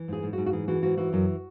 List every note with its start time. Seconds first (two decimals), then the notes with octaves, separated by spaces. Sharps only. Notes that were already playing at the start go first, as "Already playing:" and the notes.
Already playing: E3
0.08 G#2 G#4
0.23 G#2
0.33 F#4
0.38 G#2
0.46 F#4
0.53 E3 G#4
0.68 E3 F#4
0.83 G#2 F#4
0.98 E3 F#4
1.13 F#2 F#4